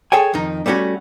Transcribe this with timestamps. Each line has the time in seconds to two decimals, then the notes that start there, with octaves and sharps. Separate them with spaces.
0.12 G#4 A4 C#5 G5 G#5
0.34 F2 D#3 D#4
0.66 G3 A3 B3 C#4 F#4